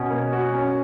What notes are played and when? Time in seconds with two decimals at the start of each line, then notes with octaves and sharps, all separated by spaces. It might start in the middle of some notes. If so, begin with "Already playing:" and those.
Already playing: B2 C#4
0.10 A#3
0.33 F#4
0.54 C#4